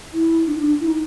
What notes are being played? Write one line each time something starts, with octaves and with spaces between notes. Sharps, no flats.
E4
D4
D#4
D4
E4
D#4